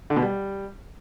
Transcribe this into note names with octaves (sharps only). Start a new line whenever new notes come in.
D3
B2
G3